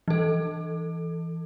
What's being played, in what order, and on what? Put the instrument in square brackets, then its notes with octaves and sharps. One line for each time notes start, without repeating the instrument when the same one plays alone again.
[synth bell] E3 A4